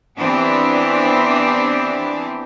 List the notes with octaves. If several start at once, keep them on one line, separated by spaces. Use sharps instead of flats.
E3 B3 C4 D4 G4